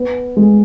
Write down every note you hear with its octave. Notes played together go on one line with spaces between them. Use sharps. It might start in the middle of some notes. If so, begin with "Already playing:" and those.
Already playing: B3
G#3